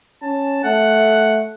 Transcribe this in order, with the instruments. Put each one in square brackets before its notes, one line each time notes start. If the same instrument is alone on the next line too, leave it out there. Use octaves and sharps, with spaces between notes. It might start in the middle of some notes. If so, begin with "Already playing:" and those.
[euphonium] C#4 [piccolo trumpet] A5
[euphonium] A3 [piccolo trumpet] F#5